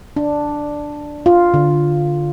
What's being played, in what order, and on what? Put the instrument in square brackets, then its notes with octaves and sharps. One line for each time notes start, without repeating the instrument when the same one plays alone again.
[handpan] D4
F4
D3